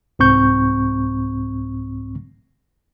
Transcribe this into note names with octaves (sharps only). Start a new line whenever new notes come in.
C2 G#2 C4 C#6 G6